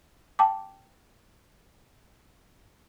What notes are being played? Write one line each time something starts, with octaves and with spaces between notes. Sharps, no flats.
G5 A5 D6